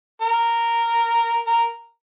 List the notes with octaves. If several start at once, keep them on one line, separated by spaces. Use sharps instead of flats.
A#4
A#4